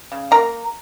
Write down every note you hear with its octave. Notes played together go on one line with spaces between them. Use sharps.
C#3
A#3 A#4 A#5